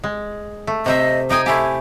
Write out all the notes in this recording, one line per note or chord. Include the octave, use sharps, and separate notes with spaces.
G#3
A3
C3 C5 D#5 E5
D#4 G5 G#5 D#6
A3 E4 G4 G#5